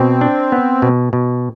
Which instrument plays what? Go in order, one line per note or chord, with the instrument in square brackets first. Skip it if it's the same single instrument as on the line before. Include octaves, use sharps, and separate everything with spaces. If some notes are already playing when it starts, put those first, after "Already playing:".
Already playing: [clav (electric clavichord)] B2 [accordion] C4
[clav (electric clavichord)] D4
B3
B2
B2